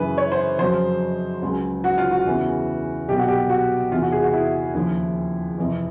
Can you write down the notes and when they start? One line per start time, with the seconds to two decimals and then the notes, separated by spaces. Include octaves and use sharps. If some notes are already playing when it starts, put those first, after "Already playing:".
Already playing: F#2 C#3 E3 B4
0.18 C#5
0.32 C5
0.59 F2 C#3 F#3 C5
1.42 C#2 C#3 F#3
1.84 F#4
1.98 F4
2.11 F#4
2.25 E2 C#3 E3
3.08 C2 B2 F#3 G4
3.18 F#4
3.28 G4
3.49 F#4
3.92 E2 C3 E3 F4
4.02 F#4
4.12 G#4
4.23 F#4
4.33 E4
4.74 D#2 C#3 F3
5.58 F2 C3 E3